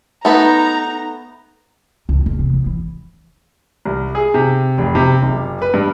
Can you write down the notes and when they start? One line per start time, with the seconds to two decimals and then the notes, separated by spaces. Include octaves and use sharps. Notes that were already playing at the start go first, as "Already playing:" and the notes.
0.25 A3 B3 D#4 B4 A#5
2.09 C#2
2.26 E2
2.39 C3
2.53 D#2
2.66 E3
3.85 C2
4.15 G#4
4.34 C3
4.78 F1
4.95 C3
5.22 F#1
5.62 B4
5.74 G2